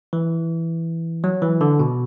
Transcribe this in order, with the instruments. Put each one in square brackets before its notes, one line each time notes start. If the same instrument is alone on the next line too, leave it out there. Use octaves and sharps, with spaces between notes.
[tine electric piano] E3
F#3
E3
D3
B2